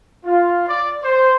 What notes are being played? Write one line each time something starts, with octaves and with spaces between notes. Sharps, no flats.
F4
D5
C5